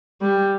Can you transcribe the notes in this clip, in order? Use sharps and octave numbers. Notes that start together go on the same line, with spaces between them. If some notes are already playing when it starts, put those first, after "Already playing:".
G3